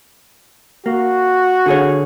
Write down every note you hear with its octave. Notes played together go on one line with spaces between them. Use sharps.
A#3 F#4
D3 G#4 C#5